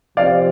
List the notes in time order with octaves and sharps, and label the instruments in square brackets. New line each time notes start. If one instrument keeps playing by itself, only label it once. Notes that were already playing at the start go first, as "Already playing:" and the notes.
[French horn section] C3 F3 C4 G4 [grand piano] D5 F5